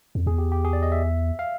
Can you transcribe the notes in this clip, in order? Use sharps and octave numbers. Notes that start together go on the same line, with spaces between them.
F2
E2 G#4
G4
G4
G#4
D5
D#5
E5
F5